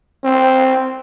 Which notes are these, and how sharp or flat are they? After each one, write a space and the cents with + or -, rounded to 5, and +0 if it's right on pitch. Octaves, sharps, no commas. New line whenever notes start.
C4 +0